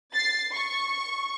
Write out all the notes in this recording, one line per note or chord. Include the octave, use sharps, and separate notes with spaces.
A6 C7
C#6